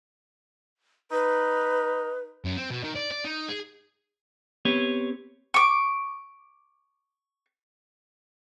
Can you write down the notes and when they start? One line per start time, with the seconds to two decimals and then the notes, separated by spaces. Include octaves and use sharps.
1.11 D#4 B4
2.45 F#2
2.57 C4
2.71 B2
2.84 D#3
2.96 D5
3.11 D5
3.25 D#4
3.49 G#4
4.65 B3 C4 G4 B4 C#5
5.54 C#6 D6